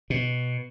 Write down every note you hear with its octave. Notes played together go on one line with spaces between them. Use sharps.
B2